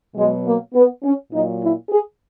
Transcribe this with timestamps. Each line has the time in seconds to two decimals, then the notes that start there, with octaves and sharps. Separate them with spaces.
0.15 B2 F#3 G#3
0.45 A#3
0.74 B3
1.02 C#4
1.31 A#2 F#3 D#4
1.61 E4
1.89 G#4